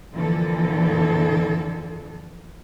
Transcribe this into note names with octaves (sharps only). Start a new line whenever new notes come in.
F2 A#2 D3 E3 F3 A4